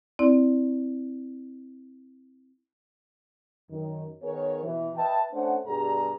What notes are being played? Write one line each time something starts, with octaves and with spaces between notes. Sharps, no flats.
C4 E4 D5
F#2 D#3
D#3 B3 G#4 A#4 B4 C#5
B2 E3
B4 D#5 E5 G5 A5
A3 C#4 D4 C5 F#5
G2 B2 G3 G#4 A#5